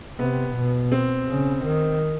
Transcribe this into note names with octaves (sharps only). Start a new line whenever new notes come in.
C3 B3
B2
C4
C#3
D#3